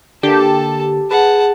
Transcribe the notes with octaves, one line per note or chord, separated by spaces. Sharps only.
D3 A#3 G4 A4 A5
G#4 B4 F#5 A5